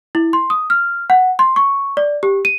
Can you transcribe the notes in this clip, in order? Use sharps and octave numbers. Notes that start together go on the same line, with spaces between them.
E4
C6
D#6
F6
F#5
C6
C#6
D5
G4
D#7